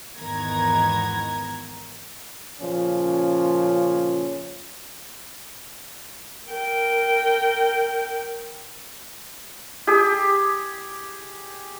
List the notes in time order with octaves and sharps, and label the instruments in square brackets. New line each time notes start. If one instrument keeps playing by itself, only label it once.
[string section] G#1 E2 D#3 B3 A#5 G#6
[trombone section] A#2 C#3 F3 C#4
[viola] A#4 G5
[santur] G4 G#4